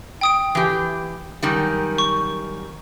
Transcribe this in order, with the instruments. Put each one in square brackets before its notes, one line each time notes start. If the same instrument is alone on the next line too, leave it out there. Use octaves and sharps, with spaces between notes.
[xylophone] G5 D#6 D7
[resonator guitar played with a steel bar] E3 G4
F#2 D#3 G3
[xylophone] C#6